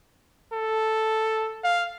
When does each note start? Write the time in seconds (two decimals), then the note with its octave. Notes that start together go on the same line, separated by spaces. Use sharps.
0.53 A4
1.64 F5